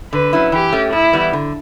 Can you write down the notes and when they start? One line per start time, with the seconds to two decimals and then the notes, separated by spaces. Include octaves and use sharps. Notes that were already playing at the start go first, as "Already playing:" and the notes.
0.12 D3 B4
0.33 F#3 C#4 E4
0.52 E3 G4
0.73 A3 C#4
0.92 A2 E4
1.13 E3 G3 B3
1.33 D3